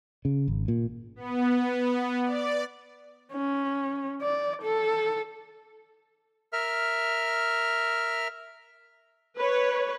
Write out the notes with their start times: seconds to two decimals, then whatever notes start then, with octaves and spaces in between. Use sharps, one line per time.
0.25 C#3
0.48 G#1
0.68 A#2
1.16 B3
2.24 D5
3.33 C#4
4.22 D5
4.62 A4
6.53 A#4 E5 F6
9.38 B4 C#5